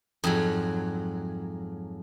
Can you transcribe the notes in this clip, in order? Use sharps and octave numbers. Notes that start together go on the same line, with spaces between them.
F2 G#2 F#3